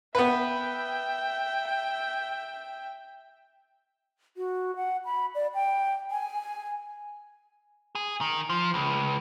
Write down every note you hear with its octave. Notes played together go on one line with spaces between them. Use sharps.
B3 B4 E5 G5
F#4
F#5
B5
D5
G5
G#5
G#4
D#3
F3
C#2